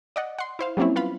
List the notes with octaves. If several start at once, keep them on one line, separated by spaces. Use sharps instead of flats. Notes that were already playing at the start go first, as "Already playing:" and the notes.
D5 D#5 F#5
F#5 C6
E4 C5 F5
F#3 G3 A#3 C4 C#4 E4
B3 F4 F5 B5